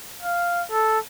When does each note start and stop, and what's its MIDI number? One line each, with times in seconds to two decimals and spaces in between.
0.23 0.63 77
0.71 0.99 69